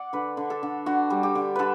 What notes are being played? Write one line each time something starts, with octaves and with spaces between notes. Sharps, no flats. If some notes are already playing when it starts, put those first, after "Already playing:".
Already playing: D5 F#5
D3 B4
D3
A4
D3
D3 F#4
G3
G4
D3
D3 A4 B4